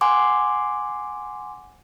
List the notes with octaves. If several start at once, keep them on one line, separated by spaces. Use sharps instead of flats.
F#5 G#5 C6 D6